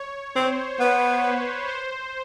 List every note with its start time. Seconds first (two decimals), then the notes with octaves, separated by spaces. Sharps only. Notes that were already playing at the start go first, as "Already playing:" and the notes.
Already playing: C#5
0.35 C4 C5
0.80 B3 B4
1.23 B4
1.68 C5